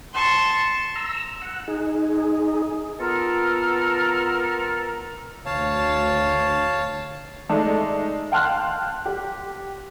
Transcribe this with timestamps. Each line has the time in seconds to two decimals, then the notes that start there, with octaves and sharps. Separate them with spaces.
0.14 A5 C6 C#6
0.96 A#5 E6
1.42 F#5
1.68 D#4 G#4
3.00 B3 F4 A4 A#4
5.46 D2 C#5 F5 A5
7.49 G#3 A3 D#4 A4 D5
8.32 F5 G5 A5 C6 F6 F#6
9.06 G4